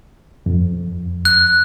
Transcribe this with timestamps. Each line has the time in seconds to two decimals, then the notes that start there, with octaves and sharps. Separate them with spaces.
0.46 F2
1.25 F#6